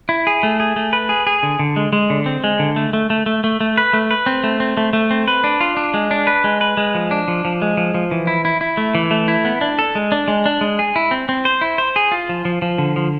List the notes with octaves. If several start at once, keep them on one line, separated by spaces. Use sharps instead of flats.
E4
G#4
A3
G#4
A3
B4
G#4
G#4
D3
D3
G#3
G#3
D3
C4
G#3
D3
A3
A3
A3
A3
A3
A3
B4
A3
B4
C4
A3
C4
A3
A3
C4
B4
D4
F4
D4
G#3
D4
B4
G#3
B4
G#3
F3
D4
F3
F3
G#3
F3
F3
E3
E4
E4
E4
A3
E3
A3
E4
B3
D4
A4
G#3
D4
G#3
D4
G#3
G#4
E4
C4
C4
C5
E4
C5
G#4
F4
F3
F3
F3
D3
F3